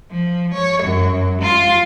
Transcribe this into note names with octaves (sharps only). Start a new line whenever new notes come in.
F3
C#5
F#2
F4